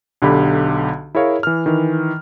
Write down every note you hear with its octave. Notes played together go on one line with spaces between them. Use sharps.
B1 D3 G4 B5
E4 G#4 A#4 C#5 F5
E3 F6
D#3 E3